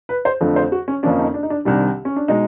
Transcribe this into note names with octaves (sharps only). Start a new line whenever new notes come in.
B4
C5
F2 D3 F3 A3
C5
F#4
C#4
F2 D3 F3 A#3 C#4 D4
D#4
D4
D#4
D4
C2 C3 D#3 G3 D4
C#4
D4
B2 G#3 D#4